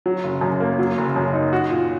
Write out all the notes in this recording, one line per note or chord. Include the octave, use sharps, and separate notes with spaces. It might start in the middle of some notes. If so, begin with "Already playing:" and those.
F#3
F#1
F#2
A#3
F#3
F#1
F#2
D#4
F#4
A#2